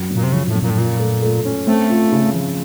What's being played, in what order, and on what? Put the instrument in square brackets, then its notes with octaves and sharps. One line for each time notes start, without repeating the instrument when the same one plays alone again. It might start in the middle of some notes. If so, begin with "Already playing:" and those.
Already playing: [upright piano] F#2 F#3
F#2
[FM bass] A#2
C3
[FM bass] C#3 [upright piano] F3
[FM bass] A2
[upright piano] F#2
[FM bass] A#2
A2
[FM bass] A#2 [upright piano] F4
[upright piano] A3
A3
C#4
[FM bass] A3 [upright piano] C4
[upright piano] F4
C#3
F3